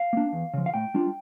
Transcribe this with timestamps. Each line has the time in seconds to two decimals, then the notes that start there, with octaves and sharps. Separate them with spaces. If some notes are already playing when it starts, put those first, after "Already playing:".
Already playing: F5
0.13 A#3 D4
0.33 E2
0.54 C#3 F3
0.66 F5
0.74 A2 G5
0.94 G3 D4 F4